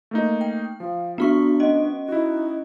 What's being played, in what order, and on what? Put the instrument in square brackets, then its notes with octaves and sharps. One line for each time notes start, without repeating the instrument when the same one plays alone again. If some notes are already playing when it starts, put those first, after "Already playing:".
[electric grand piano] A3 A#3 D#4
[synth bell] G5
[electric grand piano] F3 [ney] F5
[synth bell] B3 F#4 C#6 [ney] D4
[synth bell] C#4 D#5
[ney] D#4 [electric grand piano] E4 F#4